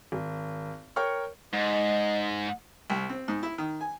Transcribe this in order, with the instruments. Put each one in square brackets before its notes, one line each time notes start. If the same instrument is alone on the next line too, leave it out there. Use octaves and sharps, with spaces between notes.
[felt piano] G#1
A#4 C#5 G5 C#6 F6
[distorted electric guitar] G#2 [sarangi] D#5
[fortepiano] C2
C4
G#2
E4
D#3
G#5